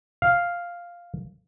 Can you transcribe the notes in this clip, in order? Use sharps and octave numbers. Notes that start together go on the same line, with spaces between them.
F5